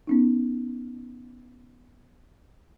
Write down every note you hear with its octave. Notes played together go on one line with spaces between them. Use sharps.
B3 C#4 D#4